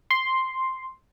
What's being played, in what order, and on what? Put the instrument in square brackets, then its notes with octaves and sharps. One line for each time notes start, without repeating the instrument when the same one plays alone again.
[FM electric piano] C6